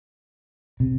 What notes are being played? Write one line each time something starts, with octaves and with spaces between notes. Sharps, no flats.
C3